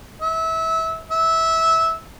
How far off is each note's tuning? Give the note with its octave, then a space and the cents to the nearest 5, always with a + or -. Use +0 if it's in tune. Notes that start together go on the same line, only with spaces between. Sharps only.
E5 -25
E5 -15